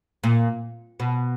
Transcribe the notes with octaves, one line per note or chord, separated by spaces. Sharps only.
A#2
B2